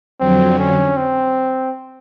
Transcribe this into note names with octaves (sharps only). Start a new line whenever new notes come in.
F2 D3 F#3 C4
C#4
C4